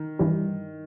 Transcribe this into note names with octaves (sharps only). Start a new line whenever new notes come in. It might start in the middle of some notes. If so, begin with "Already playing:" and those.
Already playing: D#3
G2 E3 G3